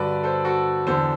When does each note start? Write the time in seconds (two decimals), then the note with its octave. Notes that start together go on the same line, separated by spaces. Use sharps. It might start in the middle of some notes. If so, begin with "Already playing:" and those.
Already playing: G2 D3 F#4 A4 B4 D5
0.23 A4 C5
0.45 F#4 A4
0.87 E2 D3 A4 C5